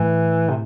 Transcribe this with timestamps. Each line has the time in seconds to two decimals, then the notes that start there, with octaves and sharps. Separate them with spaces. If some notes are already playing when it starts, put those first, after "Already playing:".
Already playing: A2 E3
0.49 C3